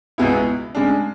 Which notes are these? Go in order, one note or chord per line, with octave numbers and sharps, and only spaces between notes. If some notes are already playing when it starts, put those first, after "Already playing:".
C#2 B2 G#3 B3 E4
C#3 G#3 D4